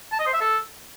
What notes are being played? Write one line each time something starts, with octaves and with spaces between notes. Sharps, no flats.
A5
D#5
C5
E5
A4